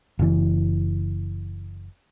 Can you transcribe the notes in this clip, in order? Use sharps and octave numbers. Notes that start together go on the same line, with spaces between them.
F#1 E3